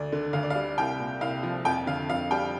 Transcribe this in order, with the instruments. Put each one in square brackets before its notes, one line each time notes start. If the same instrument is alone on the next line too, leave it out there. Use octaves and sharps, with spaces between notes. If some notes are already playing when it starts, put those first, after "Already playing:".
Already playing: [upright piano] D2 D5
D3
D2 F5
D5
F5
G3
C2 G5
A#2
C2 F5
F3
F2 G5
D3 F5
F2 F5
G3 G5